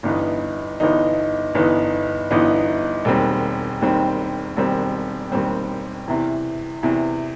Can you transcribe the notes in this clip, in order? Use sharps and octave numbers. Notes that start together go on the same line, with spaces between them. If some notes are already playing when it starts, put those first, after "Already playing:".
G1 G2 E3 B3 D#4
G1 G2 E3 B3 D#4
G1 G2 E3 B3 D#4
G1 G2 E3 B3 D#4
E1 D#2 D#3 G3 C4
E1 D#2 D#3 G3 C4
E1 D#2 D#3 G3 C4
E1 D#2 D#3 G3 C4
E2 C3 E3
E2 C3 E3